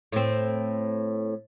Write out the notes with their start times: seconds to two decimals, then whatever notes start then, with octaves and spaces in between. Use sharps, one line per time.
0.12 A2 C4